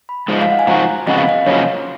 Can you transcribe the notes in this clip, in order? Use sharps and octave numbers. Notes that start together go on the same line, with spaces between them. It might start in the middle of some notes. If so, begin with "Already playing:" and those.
B5
G#2 F3 G#3 D#5
F5
F#5
G#5
G#2 F3 F#4 A#5
F2 C#3 G#3 B3 F#4 D#5
F5
D#5
F#2 C#3 F3 A#3 F4 C#5